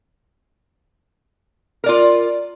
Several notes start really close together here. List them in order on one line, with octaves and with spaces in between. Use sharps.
A#4 D5 F4